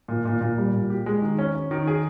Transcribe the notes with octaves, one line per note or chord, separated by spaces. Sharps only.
A#2
A#2
A#2
G3
A#2
G4
G#3
D#3
C#4
C#4
D#3
G#4